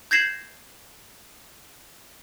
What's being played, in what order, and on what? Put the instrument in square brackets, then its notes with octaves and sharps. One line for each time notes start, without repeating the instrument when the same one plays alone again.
[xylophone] G6 G#6 A#6 C7 E7 F#7